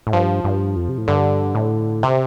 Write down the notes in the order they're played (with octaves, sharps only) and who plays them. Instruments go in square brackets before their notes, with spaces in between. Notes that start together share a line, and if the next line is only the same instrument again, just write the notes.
[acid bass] A2
[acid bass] G2 [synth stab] F3
[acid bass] G2
F2
C3
A2
[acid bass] G2 [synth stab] D3
[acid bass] A2
[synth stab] C3